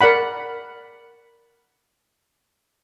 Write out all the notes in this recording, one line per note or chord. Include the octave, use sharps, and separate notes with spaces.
A#4 D5 F#5 B5